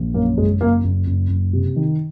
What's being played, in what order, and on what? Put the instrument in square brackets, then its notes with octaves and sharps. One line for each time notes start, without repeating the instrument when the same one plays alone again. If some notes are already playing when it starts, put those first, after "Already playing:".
Already playing: [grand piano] A#1
F#2 A#3
F#1 G#3
F#1 A#3
F#1
F#1
F#1
C3
D#3